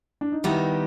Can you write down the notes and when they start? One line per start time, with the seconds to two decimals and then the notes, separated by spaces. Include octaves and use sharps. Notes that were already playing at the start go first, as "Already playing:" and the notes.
0.21 D4
0.32 D#4
0.44 D#3 G3 B3 D#4 E4